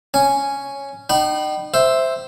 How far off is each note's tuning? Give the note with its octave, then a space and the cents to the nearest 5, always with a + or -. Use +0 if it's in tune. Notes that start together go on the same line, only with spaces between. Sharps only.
C#4 +0 G#5 +0
D#4 -40 G5 -35 B5 -5
C5 +0 E5 +0